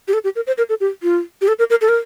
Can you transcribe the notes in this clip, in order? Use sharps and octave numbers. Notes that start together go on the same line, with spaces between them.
G4
A4
G4
A#4
C5
A#4
A4
G4
F4
G4
A4
A#4
A#4
A4
A#4